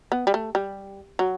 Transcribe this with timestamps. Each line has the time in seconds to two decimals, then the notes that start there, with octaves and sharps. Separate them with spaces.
0.12 B3
0.27 G3
0.34 A3
0.55 G3
1.19 F#3